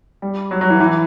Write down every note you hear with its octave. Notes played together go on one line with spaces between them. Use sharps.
G3
F#3
F#3
E3
E3